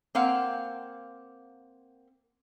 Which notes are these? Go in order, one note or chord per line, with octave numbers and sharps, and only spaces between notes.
A#3 C4 F5 F#5